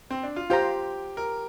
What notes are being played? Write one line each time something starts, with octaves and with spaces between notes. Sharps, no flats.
C4
D4
F4
F4 G4 C5 A#5
A#4